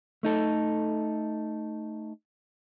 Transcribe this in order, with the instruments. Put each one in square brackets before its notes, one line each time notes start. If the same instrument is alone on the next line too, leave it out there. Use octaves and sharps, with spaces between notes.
[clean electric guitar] A3 D#4 A4